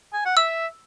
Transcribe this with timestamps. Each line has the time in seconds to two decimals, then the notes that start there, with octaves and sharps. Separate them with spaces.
0.13 G#5
0.25 F#5
0.37 E5 E6